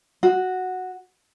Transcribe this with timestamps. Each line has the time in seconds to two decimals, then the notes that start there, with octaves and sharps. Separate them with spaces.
0.23 F#4